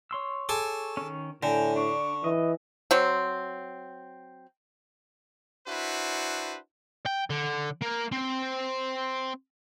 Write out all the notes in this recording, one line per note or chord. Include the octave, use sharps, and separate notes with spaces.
C#5 C6 E6
G#4 A4 D6
D#3 C#4
A2 D3 G5 G#5 A#5
D4 C#6
E3 D#5
F#3 C4
D4 E4 F#4 B4 C5
G5
D3
A#3
C4